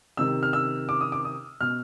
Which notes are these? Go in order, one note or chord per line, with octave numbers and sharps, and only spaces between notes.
C3 D#3 E6
F6
E6
D6
D#6
D6
D#6
B2 F6